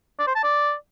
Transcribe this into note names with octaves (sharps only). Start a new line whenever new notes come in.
D5
C5
A5
D5